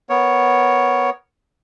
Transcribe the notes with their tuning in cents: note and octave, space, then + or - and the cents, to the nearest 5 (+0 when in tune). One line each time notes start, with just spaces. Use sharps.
B3 +0 A#4 +0 C#5 +0